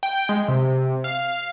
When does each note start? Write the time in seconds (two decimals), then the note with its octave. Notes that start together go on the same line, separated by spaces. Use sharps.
0.03 G5
0.29 G#3
0.48 C3
1.04 F5